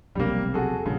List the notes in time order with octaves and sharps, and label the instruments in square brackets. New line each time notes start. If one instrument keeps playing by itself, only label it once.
[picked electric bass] F1 B1 C3 [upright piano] G3 A#3
[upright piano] F#4 G#4 A4
[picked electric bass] A#1 A#2 G3 [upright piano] C#3